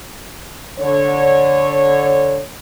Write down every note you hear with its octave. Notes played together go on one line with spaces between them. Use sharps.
D3 C#5